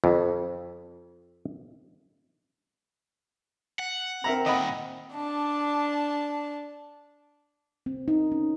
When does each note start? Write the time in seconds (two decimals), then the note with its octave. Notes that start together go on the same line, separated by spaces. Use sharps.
0.04 F2
3.79 F#5
4.24 C4 A#4 E5 A#5
4.46 A#2 D#3 D#5 F#5 B5
5.15 D4 A5
7.86 C4
8.08 D#4
8.32 C#4